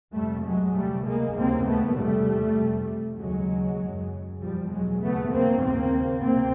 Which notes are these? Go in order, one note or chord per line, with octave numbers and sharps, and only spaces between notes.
F2 C3 G3 A3
F#3 G#3
D2 C3 G3 A3
G#3 A#3
D#2 C#3 A#3 C4
A3 B3
E2 C3 G3 A3
F2 C3
D#2 C#3 F#3 G#3
F#2 C#3
E2 B2 F3 G3
F#3 G#3
D#2 C#3 A3 B3
A#3 C4
D#2 C#3 A#3 C4
D2 C3 A#3 C4